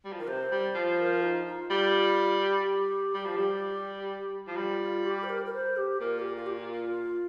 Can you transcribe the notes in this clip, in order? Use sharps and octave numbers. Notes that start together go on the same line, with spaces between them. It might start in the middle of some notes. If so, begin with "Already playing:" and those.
G3
F3
D#3 A#4
C3 C5
G3
F3
A#4
D#4
F4
G3 F4
G4
G3
F3
G3
F3
G3 F4
F4
G4
C5
A#4
A#4
C5
G4
A#2 A#4
G4
F4
G4
F4
F4